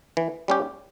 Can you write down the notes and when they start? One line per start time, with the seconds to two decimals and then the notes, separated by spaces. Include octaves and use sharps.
0.17 E3
0.48 G3 C#4 G4